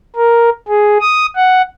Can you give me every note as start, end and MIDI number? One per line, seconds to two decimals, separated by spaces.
0.16 0.49 70
0.68 0.98 68
1.01 1.26 87
1.36 1.62 78